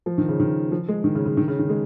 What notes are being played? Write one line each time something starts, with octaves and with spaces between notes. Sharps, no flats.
F3
D#3
C#3
D#3
F3
G#3
D#3
C#3
C#3
D#3
C#3
D#3
G#3